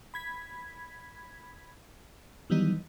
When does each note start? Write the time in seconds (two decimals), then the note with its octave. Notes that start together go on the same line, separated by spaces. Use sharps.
0.14 B5 G#6 B6
2.50 D#3 E3 F#3 G3 B3 D#4